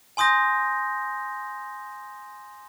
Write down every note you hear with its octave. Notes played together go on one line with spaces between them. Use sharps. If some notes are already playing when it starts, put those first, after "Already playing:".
G#5 C6 D#6 G6 A#6